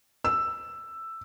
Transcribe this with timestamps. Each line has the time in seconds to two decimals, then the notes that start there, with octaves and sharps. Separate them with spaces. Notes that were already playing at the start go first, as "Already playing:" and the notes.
0.24 E6